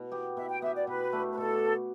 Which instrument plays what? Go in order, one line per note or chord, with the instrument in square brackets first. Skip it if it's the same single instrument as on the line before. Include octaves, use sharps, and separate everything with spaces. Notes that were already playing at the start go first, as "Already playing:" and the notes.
Already playing: [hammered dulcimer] B2
B3 G4
[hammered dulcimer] B2 [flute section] E5
[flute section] G5
[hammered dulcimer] B3 G4 [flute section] E5
[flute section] D5
[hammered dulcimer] B2 [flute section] B4
[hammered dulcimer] A3 D4
[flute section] B4
[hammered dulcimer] B2 [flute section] A4